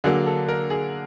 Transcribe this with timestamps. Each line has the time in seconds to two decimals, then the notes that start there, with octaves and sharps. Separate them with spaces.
0.04 D3 F#3 A#3 G#4
0.26 A4
0.49 A#4
0.70 G#4